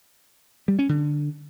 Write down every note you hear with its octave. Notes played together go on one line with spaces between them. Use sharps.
G3
C#4
D3